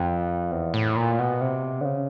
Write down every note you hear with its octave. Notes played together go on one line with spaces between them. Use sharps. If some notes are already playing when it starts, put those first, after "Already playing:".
Already playing: F2
E2
A2
A#2
B2
C3
D3
C#3